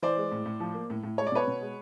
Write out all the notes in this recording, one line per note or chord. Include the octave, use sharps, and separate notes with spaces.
E3 C5 D5
G#3
A2
A2
F3
A#3
A2
A2
G#3 C#5
D5
B2 B4 C#5
B2
G#3